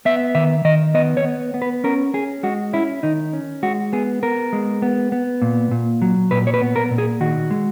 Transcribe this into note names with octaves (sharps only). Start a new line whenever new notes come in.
B3 E5
D#3 E5
D#3 D#5
B3 D#5
C#5
B3
B3
B4
C#4 A#4
C#4 G#4
G#3 F#4
C#4 E4
D#3 D#4
C#4
G#3 F#4
B3 G#4
B3 A#4
G#3
B3
B3
A#2
A#2
F#3
A#2 B4
C#5
B4
B3
A#4
A#2
G#4
D#3 F#4
G#3